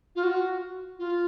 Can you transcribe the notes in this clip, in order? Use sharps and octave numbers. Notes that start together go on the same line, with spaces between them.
F4
F#4
F4